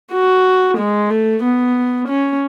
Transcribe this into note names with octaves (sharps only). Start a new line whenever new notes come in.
F#4
G#3
A3
B3
C#4